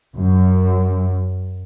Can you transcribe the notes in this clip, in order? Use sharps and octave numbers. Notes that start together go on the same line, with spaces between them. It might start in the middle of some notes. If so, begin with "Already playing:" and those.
F#2